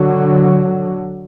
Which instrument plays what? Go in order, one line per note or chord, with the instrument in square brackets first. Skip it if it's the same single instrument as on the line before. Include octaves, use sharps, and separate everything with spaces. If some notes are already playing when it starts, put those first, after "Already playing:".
Already playing: [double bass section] D3 F#3